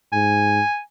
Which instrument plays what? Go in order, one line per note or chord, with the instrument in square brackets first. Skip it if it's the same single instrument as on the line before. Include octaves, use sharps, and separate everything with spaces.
[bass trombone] G#2 [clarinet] G#5